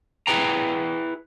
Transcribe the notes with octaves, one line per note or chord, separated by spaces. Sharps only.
E4 G#4 B4 G5 A#5